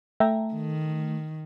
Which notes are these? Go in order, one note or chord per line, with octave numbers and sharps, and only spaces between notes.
A3 E5 G5 A#5
D#3